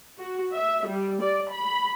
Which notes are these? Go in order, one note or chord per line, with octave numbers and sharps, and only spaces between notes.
F#4
E5
G3
D5
B5